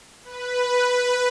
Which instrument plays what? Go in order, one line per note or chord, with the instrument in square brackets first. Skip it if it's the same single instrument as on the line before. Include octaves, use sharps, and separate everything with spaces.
[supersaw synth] B4